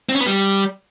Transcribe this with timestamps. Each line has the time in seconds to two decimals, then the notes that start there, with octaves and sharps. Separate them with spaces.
0.09 C4
0.15 C#4
0.21 B3
0.26 G3